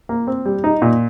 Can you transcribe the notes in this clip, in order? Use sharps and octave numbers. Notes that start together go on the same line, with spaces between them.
A#3
C4
G3
D#4
A#2